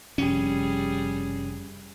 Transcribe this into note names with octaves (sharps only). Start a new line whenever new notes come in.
F#1 C3 F3 G3 C#4 G#4